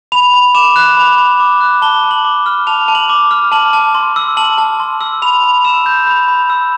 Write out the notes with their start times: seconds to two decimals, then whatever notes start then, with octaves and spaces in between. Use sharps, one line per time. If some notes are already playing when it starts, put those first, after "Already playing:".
0.12 B5 F7
0.34 B5
0.55 D6 E7
0.76 F#6
0.97 B5
1.18 B5
1.40 D6
1.60 F#6
1.82 A5 G7
2.03 A5
2.11 F#7
2.25 D6
2.46 F6
2.67 A5 F7
2.88 A5
2.95 F#7
3.09 D6
3.31 F6
3.52 A5 F#7
3.73 A5
3.95 C6
4.16 E6
4.37 A5 F#7
4.58 A5
4.80 C6
5.01 E6
5.22 B5 F7
5.44 B5
5.64 E6 E7
5.86 G6
6.07 B5
6.28 B5
6.50 E6